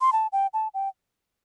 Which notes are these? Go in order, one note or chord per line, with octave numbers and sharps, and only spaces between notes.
C6
A5
G5
A5
G5